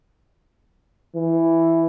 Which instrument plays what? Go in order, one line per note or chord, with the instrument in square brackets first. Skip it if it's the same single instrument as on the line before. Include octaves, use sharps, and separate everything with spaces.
[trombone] E3